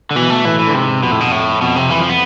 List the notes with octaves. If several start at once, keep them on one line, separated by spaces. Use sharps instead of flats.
D3
B2 E3
A3
A2 E3
E3
D3
G#2 C3
F2 B2
A2
B2
A2
F2 B2
C3
E3
F3
B3